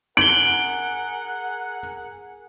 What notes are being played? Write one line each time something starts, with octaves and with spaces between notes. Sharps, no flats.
G#4 A#4 F#5 D7 F#7 G7